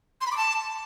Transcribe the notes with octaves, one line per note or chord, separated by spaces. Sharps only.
C6
B5
D6
A5